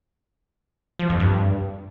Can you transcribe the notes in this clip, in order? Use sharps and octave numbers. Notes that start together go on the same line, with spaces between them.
F3
F2
G2